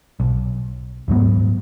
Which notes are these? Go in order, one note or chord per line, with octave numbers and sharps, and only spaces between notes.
B1
D#1 G#2 F#3 B3